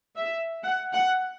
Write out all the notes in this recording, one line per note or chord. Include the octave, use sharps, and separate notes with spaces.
E5
F#5
F#5